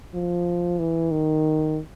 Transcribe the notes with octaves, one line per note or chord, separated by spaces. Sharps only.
F3
E3
D#3